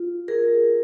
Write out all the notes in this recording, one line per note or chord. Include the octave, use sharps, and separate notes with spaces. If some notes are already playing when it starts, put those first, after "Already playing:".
Already playing: F4
G#4 A#4